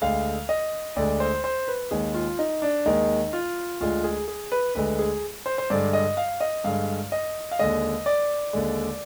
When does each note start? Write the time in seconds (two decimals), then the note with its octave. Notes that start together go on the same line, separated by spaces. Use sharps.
0.02 D2 D3 G#3 F5
0.49 D#5
0.96 D2 D3 G#3 D5
1.20 C5
1.44 C5
1.68 B4
1.91 D#2 D#3 G#3 G#4
2.14 F4
2.39 D#4
2.62 D4
2.86 D#2 D#3 G#3 D#4
3.33 F4
3.81 D2 D3 G#3 F4
4.04 G#4
4.28 G#4
4.52 B4
4.75 D2 D3 G#3 B4
4.99 G#4
5.46 C5
5.58 C5
5.70 G2 D3 G#3 D5
5.93 D#5
6.17 F5
6.40 D#5
6.64 G2 D3 G#3 F5
7.12 D#5
7.51 F5
7.59 D#2 D3 G#3 D#5
8.06 D5
8.53 D#2 D3 G#3